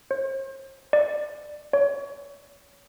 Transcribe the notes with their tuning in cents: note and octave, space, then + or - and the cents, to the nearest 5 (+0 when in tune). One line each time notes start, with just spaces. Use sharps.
C5 +45
D5 +20
C#5 +30